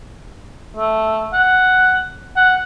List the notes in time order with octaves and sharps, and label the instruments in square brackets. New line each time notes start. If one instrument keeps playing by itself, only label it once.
[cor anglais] A3
F#5
F#5